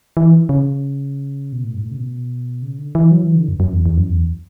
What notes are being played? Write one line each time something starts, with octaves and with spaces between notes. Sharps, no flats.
E3
C#3
B2
A2
G2
A2
C#3
B2
C#3
D3
E3
F#3
E3
D3
F#2
F#2
E2
E2
F#2
E2